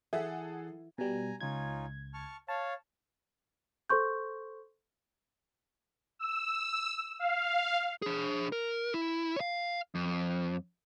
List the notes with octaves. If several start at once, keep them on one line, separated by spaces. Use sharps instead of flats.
E3 G#4 A4 E5 F#5
B2 G3 G#5 A#5
C#2 C#4 D#4 F4 G#6
A5 C#6 F6
C#5 F5 A5
A4 C5 C6 C#6 G6
E6
F5
D4 G#4
A#4
E4
C#5 F5
F2